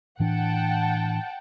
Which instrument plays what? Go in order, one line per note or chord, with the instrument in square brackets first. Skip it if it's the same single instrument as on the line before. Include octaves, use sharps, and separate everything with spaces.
[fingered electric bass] A2 E3 D4 [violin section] F#5 G5 A5